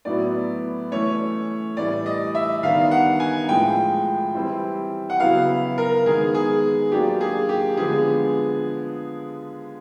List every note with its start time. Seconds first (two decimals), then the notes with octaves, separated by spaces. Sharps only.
0.05 A2 F#3 B3 E4 D5
0.91 E3 A3 C#4 C#5
1.77 A2 E3 G3 D5
2.06 D#5
2.35 E5
2.63 D#3 G3 B3 D4 F5
2.91 F#5
3.20 G#5
3.49 A2 F3 G#3 G5
4.34 E3 G3 C4 E4
5.10 F#5
5.20 C#3 F#3 B3 E4 F5
5.78 A#4
6.06 D#3 G#3 B3 G#4
6.35 G#4
6.92 F#3 A#3 D4 F4 G4
7.21 G#4
7.49 G4
7.77 D3 F3 G#3 B3 G#4